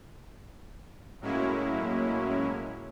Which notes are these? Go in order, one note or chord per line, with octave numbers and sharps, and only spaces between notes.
A2 F#3 G#3 A#3 C#4 E4